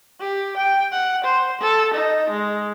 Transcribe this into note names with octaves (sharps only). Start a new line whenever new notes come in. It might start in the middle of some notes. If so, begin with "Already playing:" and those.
G4
G5
F#5
C5
A4
D#4
G#3